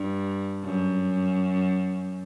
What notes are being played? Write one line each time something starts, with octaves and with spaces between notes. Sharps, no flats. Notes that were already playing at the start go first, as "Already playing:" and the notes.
Already playing: G2
F#2